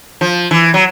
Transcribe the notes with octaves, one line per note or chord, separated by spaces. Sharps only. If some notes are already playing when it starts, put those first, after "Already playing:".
F3
E3
F#3